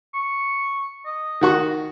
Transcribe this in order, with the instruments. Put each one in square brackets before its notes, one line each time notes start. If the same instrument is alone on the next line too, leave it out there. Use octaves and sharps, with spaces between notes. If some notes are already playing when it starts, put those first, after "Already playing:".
[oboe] C#6
D#5
[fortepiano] D#3 F#4 C#6